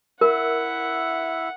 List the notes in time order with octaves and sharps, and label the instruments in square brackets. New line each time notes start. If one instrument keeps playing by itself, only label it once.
[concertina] E4 E5 [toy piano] A#4 [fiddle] F#5